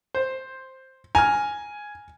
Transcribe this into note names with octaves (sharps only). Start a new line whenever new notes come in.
C5
G#5 A#5 F6